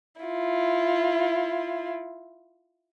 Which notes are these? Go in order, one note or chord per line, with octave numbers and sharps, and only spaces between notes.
E4 F4